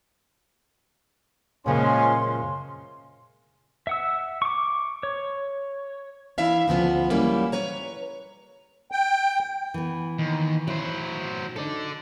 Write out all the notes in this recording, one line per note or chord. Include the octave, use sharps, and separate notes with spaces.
F#2 A#2 C#3 F3 G#3 C#4 A#4 C6
E5 F#5 E6
C#6 D6
C#5
E3 D4 E4 E5 F5
D2 C#3 F3 B3
E3 F#3 G3 A#3 C#4 E4
B4 C#5 A#5
G5
E3 B3
D#2
F#3 E4 C5
D#4 A4 D5